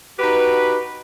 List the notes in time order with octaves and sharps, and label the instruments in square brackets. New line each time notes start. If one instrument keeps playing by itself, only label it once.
[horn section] D#4 F#4 G4 B4